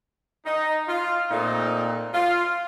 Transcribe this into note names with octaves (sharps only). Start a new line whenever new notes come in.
D#4
F4
A#2 A3 C4 D#4
F4